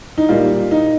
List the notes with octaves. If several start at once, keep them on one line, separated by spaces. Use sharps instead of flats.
D#4
A#2 G3 A#3 F4
D#4